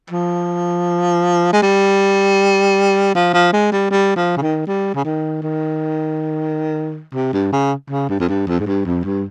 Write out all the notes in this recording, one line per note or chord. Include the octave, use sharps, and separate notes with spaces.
F3
G#3
G3
F3
F3
G#3
G3
G3
F3
C#3
D#3
G3
C#3
D#3
D#3
C3
G2
C#3
C#3
G2
F2
G2
F2
G#2
G2
F2
G2